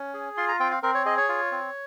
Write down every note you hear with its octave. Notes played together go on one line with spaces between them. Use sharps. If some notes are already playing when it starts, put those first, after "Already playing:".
Already playing: C#4
G#4
F4 C6
A#5
C4 G5
F5
C4 A#4
C#5
G#4 D#5
C#5
F4
C4